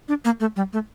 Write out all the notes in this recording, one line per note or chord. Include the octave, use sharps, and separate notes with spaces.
D4
A#3
A3
G3
A3